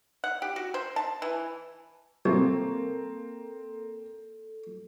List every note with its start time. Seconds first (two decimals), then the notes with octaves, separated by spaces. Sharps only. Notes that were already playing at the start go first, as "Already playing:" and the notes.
0.24 F#5
0.42 G4
0.56 F#4
0.74 C5
0.96 A5
1.22 E3
2.25 C2 A#3 C4 A4